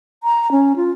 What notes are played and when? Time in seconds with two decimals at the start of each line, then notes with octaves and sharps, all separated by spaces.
0.24 A#5
0.52 C#4
0.76 F4